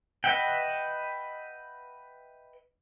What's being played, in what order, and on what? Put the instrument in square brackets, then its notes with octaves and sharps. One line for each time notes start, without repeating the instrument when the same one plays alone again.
[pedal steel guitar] B4 D#5 E5 F#5 G5